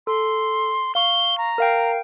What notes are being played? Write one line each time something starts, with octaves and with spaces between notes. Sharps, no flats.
A4 C6
F5 C#6 G7
A#5
A#4 F5 G5